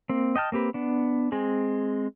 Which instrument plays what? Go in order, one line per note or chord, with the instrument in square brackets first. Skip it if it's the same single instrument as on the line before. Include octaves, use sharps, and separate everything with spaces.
[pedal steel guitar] A#3 C4
D#5 G5 A5 F6
A#3 C4 G4 B4
B3 D4
G#3 C4 G#4